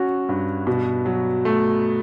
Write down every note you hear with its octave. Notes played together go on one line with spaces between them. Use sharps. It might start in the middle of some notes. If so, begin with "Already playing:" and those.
Already playing: F#3 C#4 F#4
G2
B2
F#3
A3